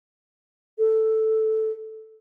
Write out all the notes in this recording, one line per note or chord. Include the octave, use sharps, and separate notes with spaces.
A4